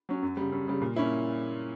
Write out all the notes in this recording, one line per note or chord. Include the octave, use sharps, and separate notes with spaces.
F#3 C#4
F#2
C#3 G3
F#2
C#3 G3
A#2
A#3 C#4 E4